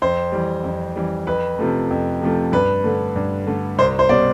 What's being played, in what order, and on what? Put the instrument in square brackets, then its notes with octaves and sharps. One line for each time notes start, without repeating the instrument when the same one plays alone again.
[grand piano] F2 C5
E3 G3
F2
E3 G3
F2 B4
C3 F3 A3
F2
C3 F3 A3
G2 B4
D3 A3
G2
D3 A3
C2 C5
C5
B2 G3 D5